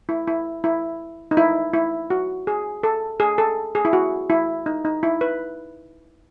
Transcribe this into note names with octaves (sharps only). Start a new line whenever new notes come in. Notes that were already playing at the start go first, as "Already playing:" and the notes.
E4
E4
E4
D#4
E4
E4
F#4
G#4
A4
G#4
A4
G#4
E4
F#4
E4
D#4
D#4
E4
B4